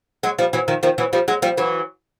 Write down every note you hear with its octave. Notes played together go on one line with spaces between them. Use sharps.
F#3 G#3
F3 G3
E3 F#3
D#3 F3
D#3 F3
E3 F#3
F3 G3
F#3 G#3
F3 G3
E3 F#3